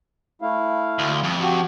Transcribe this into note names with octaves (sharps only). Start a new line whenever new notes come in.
A3 E4 F5
D2
F2
F#4 G4